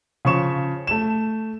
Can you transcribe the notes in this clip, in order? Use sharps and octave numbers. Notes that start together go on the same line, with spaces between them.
C#3 F3 C#6 E7
A3 E7